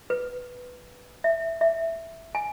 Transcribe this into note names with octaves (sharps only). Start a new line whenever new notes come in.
B4
E5
E5
G#5